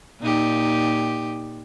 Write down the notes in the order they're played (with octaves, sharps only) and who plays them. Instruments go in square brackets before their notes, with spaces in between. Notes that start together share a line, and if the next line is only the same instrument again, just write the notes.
[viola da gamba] A#2 D#4 G4